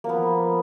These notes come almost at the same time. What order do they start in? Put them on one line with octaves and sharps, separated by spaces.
A#3 F3 B3